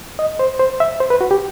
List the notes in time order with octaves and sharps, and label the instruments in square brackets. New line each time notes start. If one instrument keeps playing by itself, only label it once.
[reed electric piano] D#5
C5
C5
E5
C5
B4
F#4
G4